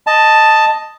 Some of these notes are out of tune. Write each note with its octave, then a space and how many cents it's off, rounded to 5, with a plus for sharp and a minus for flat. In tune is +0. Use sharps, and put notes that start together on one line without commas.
D#5 +0 A5 +5